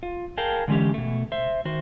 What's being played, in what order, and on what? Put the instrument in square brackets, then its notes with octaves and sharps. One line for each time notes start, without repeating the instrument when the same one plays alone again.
[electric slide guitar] F4
G#4 A#4 F5 G5 A5
D3 E3 G#3 C#4 G4
B2 A3
C5 E5
D#3 F#4 C5